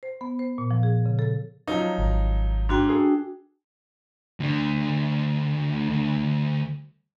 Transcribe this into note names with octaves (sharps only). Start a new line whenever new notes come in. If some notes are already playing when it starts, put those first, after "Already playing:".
C5
B3
C5
A#2
F3
G#4
C#3
A4
F3 F#3 D#4
G#1
G#2 D4 F#4 G5
G#4 A4
D2 D3